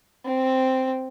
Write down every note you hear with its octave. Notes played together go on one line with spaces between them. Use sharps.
C4